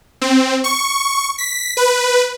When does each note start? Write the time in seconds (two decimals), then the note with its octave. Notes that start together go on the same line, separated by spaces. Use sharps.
0.22 C4
0.64 C#6
1.38 B6
1.77 B4